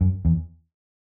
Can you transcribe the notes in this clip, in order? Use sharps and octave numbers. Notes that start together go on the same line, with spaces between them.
F#2
E2